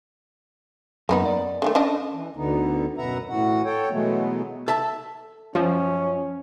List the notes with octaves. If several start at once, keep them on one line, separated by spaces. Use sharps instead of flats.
F#2 A#3 B3 D#4 B5
D5
D3 D#3 A3
C#4 D4 D#5
E3
D2 D3 B3 D#4
F#2 B2 B4 E5 F#5 A#5
A2 E3 F#4 F#5
A4 C#5 G5
B2 E3 F#3 G#3 A3 B3
A4 E5 A5
F#2 F3 C#4